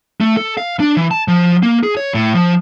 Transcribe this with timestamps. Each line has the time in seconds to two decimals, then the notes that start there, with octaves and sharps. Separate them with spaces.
0.20 A3
0.37 A4
0.57 F5
0.80 D4
0.97 E3
1.11 A5
1.28 F3
1.63 A#3
1.83 G#4
1.97 C#5
2.15 A2
2.34 F3